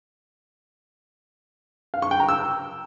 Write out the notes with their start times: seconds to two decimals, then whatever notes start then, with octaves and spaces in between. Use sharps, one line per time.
1.94 F5
2.02 C#6
2.11 G5
2.20 A#5
2.29 E6